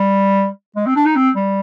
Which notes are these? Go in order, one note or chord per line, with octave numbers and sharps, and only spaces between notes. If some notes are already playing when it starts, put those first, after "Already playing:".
Already playing: G3
G#3
C4
D4
D#4
C4
G3